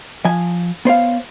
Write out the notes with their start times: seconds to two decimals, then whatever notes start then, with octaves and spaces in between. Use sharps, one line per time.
0.25 F3 G#5
0.85 B3 C5 C#5 F5